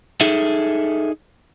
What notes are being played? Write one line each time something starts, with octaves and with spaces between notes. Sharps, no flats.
D#4 G#4 A4 E5